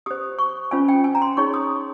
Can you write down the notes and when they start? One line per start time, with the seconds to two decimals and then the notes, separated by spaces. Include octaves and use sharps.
0.06 G4 C5 D#6
0.39 C#6
0.71 C#4 F4 C5 G#5
0.88 G5
1.04 G#5
1.15 A#5
1.22 C6
1.37 D#4 G#4 C#5 C#6
1.54 D#6